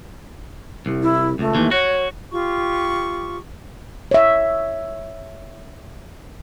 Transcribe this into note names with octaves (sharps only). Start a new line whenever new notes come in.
C2
E4
C#2 A3
D#2 E3
F#4 C#5
F4 G4 C#6
C#5 E5